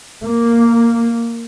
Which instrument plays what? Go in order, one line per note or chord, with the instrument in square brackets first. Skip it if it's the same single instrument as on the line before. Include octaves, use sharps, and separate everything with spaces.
[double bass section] A#3